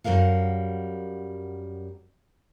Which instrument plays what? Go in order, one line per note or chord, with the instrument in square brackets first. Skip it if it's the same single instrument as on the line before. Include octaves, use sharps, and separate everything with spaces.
[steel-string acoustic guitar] F#2 G3 A#4 F5 F#5